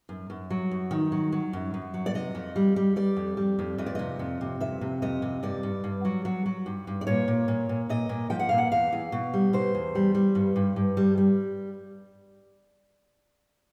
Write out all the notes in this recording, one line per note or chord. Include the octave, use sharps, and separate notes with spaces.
F#2
F#2
F#3
F#2
D#3
F#3
F#3
F#2
F#2
F#3
D5
C3 D#5
F2
G3
G3
G3 D5
F2
G3
F2
F2 D#5
D5
C3 D#5
F2
C3
F2 E5
C3
F2 D#5
C3
G2 D5
G2
G2
F#3
F#3
F#3
G2
G2
D5
A#2 C#5
A#2
A#2
A#2
A#2 D#5
A#2
F3 G5
F#5
A#2 F5
F#5
E2 F5
E2
B2
G3
B2 C5
E2
G3
G3
G2
G2
G2
G3
G3